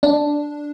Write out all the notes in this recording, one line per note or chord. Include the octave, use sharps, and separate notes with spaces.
D4